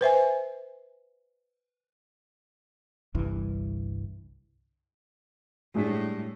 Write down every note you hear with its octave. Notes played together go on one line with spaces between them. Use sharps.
B4 C5 E5 G#5
G1 C2 G2 E3
A2 G3 G#3 D4 B6